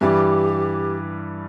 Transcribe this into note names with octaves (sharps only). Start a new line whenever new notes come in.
G2 E3 G3 G4